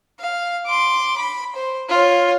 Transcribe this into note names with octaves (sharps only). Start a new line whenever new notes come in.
F5
C6 D6
B5
C5
F4 C#5